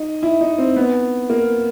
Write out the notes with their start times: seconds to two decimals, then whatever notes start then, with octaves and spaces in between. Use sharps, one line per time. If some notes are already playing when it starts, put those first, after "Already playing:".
Already playing: D#4
0.23 E4
0.41 D#4
0.58 C4
0.76 B3
1.30 A#3